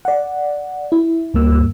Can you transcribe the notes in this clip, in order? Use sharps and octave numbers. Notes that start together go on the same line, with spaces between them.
D5 F#5
E4
D2 G2 A#3 E6